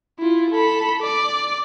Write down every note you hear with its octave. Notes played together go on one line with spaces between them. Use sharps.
E4 F4
A4 B5
D5